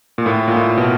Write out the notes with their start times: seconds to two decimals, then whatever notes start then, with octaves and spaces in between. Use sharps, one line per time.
0.18 A#2
0.26 A2
0.48 A#2
0.56 A2
0.78 B2